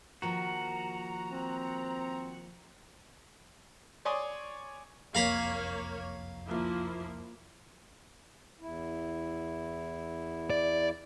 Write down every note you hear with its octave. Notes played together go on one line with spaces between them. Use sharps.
D#3 F3 A#3 F#4 A#5
C4
C#5 D5 G#5 C6 D6 D#6
F#1 C2 F2 A#3 C#5 F5 A#5 B5
F3 A#3 E4
E2 E4
D5